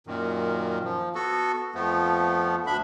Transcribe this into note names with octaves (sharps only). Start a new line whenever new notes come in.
F#2 A#2 D#3
F3
B3 F#4 A4
F2 F3 A3 B3
D2 D4 E5 B5